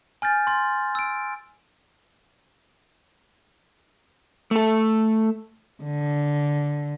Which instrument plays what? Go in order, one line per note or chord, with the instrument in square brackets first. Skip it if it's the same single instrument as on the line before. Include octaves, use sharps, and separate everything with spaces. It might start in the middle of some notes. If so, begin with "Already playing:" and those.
[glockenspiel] G#5 F6 G6 A6
C6 A6
E6 D7
[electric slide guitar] A3 A4
[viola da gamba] D3